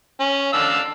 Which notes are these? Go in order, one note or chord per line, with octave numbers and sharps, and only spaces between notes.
C#4
D4 F5 E6